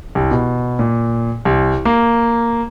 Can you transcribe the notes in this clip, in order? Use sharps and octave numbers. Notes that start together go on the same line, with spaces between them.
C2
B2
A#2
C2
A#3